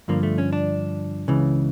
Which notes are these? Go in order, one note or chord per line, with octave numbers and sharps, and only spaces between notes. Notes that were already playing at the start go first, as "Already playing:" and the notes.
G2 D3 F3 A#3
A3
C#4
D4
C#2 C#3 E3